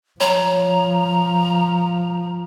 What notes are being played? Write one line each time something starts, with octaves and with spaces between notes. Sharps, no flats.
F3 C#5 A#5